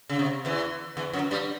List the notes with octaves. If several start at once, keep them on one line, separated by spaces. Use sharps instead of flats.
C#3
C3
E2 E3
E2 E3
F#2 F#3
G2 G3